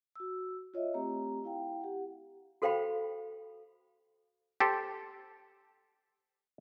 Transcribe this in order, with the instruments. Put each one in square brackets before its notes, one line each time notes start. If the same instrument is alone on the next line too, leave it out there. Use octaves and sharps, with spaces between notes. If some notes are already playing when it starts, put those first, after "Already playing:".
[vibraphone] F#4 E6
F4 C#5 D#5 E5
A3 C4 G4 A#5
E4 F5 G5
G4 F#5
[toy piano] F#4 A4 C5 F5 G5 B5
[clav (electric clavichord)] G4 A4 C5